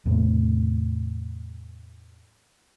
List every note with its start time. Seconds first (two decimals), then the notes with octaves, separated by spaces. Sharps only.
0.05 E2 A2 C3 A3